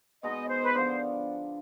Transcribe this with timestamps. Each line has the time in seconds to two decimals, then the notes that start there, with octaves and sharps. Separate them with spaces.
0.23 B2 G#3 B3 D#4 D#5
0.49 C5
0.63 B4
0.74 D3 F3 B3 D4 C5